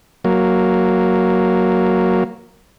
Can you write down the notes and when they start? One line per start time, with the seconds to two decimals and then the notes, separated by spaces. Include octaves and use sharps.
0.24 F#3 A#3